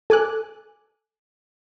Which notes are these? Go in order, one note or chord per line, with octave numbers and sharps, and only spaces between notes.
A4 G#5 D6 F#6